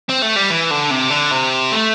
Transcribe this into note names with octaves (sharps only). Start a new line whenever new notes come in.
C4
A3
G3
E3
D3
C3
D3
C3
A3